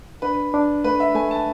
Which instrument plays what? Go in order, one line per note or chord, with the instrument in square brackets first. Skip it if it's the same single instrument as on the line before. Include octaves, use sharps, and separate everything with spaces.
[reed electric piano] D4 [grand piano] B4
[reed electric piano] D4
[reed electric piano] A3 [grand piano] B4
[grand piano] E5
[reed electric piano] A3 [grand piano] G#5
[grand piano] A5